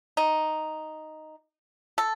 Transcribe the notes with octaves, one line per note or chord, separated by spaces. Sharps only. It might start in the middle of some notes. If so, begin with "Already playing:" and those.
D#4
A4